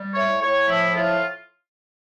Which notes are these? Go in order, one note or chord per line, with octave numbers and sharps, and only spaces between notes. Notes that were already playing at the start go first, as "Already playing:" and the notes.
Already playing: G3
A2 C#5
A2 C#5
F3 E4
A2 F4